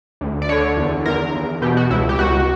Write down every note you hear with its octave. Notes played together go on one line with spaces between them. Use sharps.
D2
D5
D3 C#5
E2
E2 A#4
E2
B2 G4
F#4
C#2 E4
G4
C#2 F#4